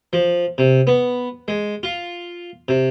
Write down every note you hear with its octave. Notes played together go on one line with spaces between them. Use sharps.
F3
C3
B3
G#3
F4
C3